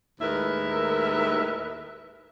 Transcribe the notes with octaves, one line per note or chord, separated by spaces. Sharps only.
D#2 A2 G#3 A#4 B4 E5